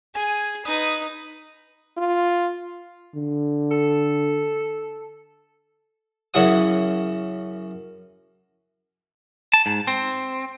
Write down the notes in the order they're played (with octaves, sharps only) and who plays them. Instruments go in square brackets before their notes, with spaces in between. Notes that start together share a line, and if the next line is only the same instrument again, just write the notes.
[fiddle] G#4 [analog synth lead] G#5
[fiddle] D#4 B4 [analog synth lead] D#6
[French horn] F4
[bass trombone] D3
[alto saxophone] A4
[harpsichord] F#2 C#3 E4 G#4 F#5 D#6
[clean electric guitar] A5
G#2
C4